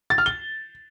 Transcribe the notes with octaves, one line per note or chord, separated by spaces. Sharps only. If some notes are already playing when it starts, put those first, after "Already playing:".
A6
F6
G7